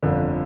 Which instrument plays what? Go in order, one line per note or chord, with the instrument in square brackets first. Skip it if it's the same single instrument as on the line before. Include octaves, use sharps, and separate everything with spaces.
[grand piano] G1 F2 D3